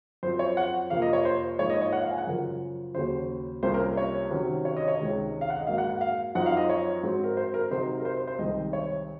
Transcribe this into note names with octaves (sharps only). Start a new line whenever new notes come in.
F#2 F3 C4 C5
C#5
F#5
F2 C3 F3 A#3 F5
D#5
C#5
C5
G#2 F3 A#3 D#4 C#5
D#5
C#5
F#5
F5
G#5
F#5
F#2 C#3 F3 A#4
D#2 C#3 F#3 C#4 C5
C2 C3 F3 A#3 C#4 C5
A#4
C#5
C3 D#3 F#3 C#4
C#5
D#5
C#5
C#2 C3 D#3 G#3 C#4
F5
F#5
D#5
G#2 F#3 A#3 F5
F#5
F#5
F5
F#2 F3 C4 D#4 F#5
F5
D#5
C#5
G#2 F#3 C4
A#4
C5
A#4
C3 F#3 C4 D#4 C5
A#4
C5
C5
C5
C2 C3 D#3 G#3 C4 D#5
C#5